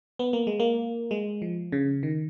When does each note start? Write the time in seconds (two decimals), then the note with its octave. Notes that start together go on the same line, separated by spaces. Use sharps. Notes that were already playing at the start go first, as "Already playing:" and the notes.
0.19 B3
0.33 A#3
0.47 G#3
0.60 A#3
1.11 G#3
1.42 F3
1.72 C#3
2.03 D#3